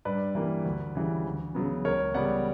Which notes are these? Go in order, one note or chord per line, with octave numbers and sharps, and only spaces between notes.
G2 B4 D5
E3 G3 A#3
D2
C#3 E3 G3
D2
C#3 F#3 B3
C#2 A#4 C#5
C#3 G3 B3 D5 F#5